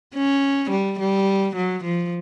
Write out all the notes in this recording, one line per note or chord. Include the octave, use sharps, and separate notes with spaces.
C#4
G3
G3
F#3
F3